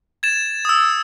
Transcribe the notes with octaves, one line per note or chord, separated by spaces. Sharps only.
G#6 A6 E7
D#6 E6